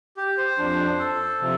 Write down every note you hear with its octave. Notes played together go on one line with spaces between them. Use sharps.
G4
C5
F2 F3 D4
A4
C3 F3